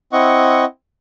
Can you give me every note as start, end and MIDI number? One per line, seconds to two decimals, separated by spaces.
0.13 0.65 60
0.13 0.65 64
0.13 0.65 75
0.13 0.65 78
0.13 0.65 85